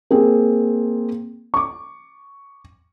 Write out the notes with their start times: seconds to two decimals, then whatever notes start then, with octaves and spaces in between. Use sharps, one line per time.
0.10 A#3 C4 G#4
1.54 C#6 D6